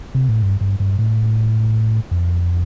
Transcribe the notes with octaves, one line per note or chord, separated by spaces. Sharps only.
C3
A2
G2
G2
G2
A2
F2